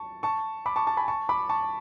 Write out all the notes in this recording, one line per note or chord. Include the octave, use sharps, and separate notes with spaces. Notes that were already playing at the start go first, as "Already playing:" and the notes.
Already playing: A5 C#6
A5 C#6
B5 D6
A5 C#6
A5 C#6
G#5 B5
A5 C#6
B5 D6
A5 C#6